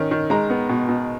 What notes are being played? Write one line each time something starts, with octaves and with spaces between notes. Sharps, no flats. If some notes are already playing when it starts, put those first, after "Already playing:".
Already playing: D#3 C#4
D#3
G#3 A#5
B3
B2
B2